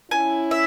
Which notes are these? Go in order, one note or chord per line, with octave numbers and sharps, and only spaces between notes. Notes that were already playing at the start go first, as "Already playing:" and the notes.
C#4 E4 G#5
E5